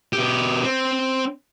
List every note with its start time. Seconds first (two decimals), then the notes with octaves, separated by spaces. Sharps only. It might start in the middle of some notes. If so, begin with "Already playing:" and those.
0.13 B2 G4
0.64 C4